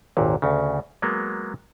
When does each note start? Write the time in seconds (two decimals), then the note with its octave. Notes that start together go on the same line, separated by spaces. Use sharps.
0.17 G#1 D#2 A#2
0.42 D2 C#3
1.02 F#3 G#3 A#3 B3